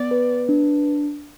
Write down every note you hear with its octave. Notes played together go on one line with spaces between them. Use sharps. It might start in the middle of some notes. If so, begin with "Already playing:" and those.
Already playing: B3 D5
B4
D4